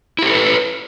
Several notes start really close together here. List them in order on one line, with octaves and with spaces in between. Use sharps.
E4 G4 A4 B4